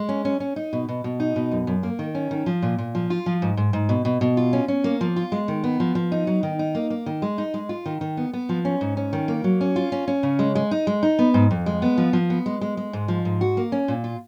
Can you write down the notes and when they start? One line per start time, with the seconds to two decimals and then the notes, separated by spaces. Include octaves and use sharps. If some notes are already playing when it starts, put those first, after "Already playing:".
Already playing: G#3
0.09 C#4
0.25 C#4
0.40 C#4
0.56 D#4
0.73 B2
0.88 B2
1.04 B2
1.20 D#4
1.36 B2
1.51 F#2
1.67 F#2
1.83 A#3
1.99 D#3
2.15 C#4
2.31 D#3
2.46 F3
2.62 A#2
2.78 A#2
2.95 F3
3.10 F4
3.26 F3
3.42 G#2
3.57 G#2
3.73 G#2
3.89 B2
4.05 B2
4.21 B2
4.37 F4
4.53 C#4
4.68 C#4
4.84 A#3
5.01 F3
5.16 F4
5.32 G#3
5.48 D#3
5.64 B3
5.80 F3
5.95 F3
6.12 D#4
6.27 F#3
6.43 D#3
6.59 D#4
6.75 A#3
6.90 A#3
7.06 D#3
7.22 G#3
7.38 D#4
7.54 G#3
7.69 F4
7.86 D#3
8.01 D#3
8.17 B3
8.33 B3
8.49 F3
8.65 C#4
8.81 G#2
8.97 C#4
9.13 D#3
9.28 A#3
9.44 F#3
9.61 C#4
9.76 F4
9.92 C#4
10.08 C#4
10.23 C#3
10.39 G#3
10.55 G#3
10.71 D#4
10.87 G#3
11.03 D#4
11.19 B3
11.34 G#2
11.51 F2
11.66 G#3
11.82 B3
11.98 F3
12.13 F3
12.30 B3
12.46 G#3
12.61 G#3
12.77 G#3
12.93 G#2
13.08 F3
13.25 G#2
13.41 F#4
13.57 A#3
13.72 C#4
13.88 A#2
14.04 F4